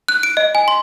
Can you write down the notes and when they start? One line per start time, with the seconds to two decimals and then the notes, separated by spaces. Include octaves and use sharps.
0.08 F#6
0.23 D7
0.37 D#5
0.55 G#5
0.68 C6